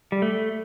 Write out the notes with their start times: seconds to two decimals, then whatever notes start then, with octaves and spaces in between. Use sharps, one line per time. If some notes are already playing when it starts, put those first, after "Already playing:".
0.12 G3
0.22 A3